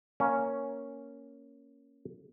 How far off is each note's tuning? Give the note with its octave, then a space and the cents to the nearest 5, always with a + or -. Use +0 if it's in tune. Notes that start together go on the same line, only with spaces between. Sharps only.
A#3 +0 C#4 +0